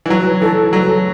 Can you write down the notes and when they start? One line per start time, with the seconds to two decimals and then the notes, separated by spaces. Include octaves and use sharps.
0.06 E3
0.10 F#3 B4
0.41 E3 A4
0.73 F#3 A4